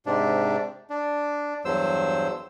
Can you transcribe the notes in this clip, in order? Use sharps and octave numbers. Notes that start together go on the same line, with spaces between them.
G#2 C3 D4
D4
E2 G2 F#3 C5 E6